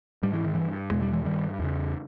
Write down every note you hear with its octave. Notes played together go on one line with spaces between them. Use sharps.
G#2 G3
E3
D#3
G2 E3
E2 B2 G#3
G3
E3 G#3
G2 D#3 G3
E2 C#3